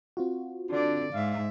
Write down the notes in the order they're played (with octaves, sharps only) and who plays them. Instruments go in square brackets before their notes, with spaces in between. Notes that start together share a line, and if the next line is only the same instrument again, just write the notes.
[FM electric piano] C4 F4 F#4
[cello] D3 D5 [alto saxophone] D4
[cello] G#2 E5 [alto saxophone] F5